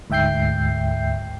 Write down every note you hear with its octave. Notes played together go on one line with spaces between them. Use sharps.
D2 G#2 E5 G5 G6 C7